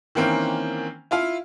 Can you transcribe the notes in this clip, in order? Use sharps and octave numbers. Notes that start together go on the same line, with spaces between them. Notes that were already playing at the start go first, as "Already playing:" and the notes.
D#3 E3 A#3 C4 C#4
E4 F4 F5